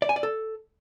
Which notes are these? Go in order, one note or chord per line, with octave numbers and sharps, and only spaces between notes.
D5
G#5
D5
A4